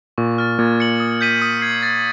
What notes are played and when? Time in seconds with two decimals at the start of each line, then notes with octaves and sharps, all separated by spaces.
0.18 A#2 C#6
0.38 F6 A6
0.59 A#2 G#6
0.80 C#7 F#7
1.00 D#6
1.21 G6 B6 D#7 F#7
1.42 D#6
1.62 G#6 C7
1.83 A6